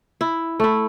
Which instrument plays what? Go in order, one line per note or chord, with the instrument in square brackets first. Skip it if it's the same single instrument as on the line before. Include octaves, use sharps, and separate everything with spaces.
[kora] E4
A3 E4